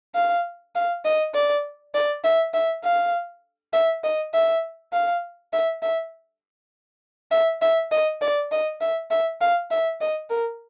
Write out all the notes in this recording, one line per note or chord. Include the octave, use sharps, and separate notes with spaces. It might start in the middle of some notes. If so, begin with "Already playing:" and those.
F5
F5
D#5
D5
D5
E5
E5
F5
E5
D#5
E5
F5
E5
E5
E5
E5
D#5
D5
D#5
E5
E5
F5
E5
D#5
A#4